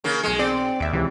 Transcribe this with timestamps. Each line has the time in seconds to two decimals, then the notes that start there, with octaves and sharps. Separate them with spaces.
0.04 C#3 A#3
0.23 B1 G#3 G#4 C#7
0.39 C4 D5
0.80 D#2 E5 D6
0.93 C#2 C3 E3